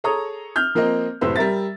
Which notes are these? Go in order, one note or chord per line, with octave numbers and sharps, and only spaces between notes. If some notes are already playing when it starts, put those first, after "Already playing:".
G#4 A4 C#5 A#5 D#6
F6 G6
F3 A#3 C4 A#4 D#5
F#1 A2 C3 B4 C5 E6
G3 A#4 E5 A6